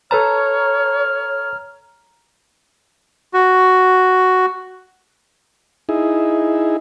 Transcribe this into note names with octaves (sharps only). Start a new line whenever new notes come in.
A4 B4 C#5 A5 A#5 F6
F#4
D#4 E4 G#4